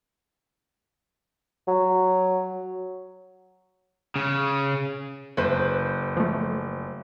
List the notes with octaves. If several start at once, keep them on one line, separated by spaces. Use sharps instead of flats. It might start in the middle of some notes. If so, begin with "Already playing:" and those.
F#3
C#3
F#1 B4 C5
F3 A3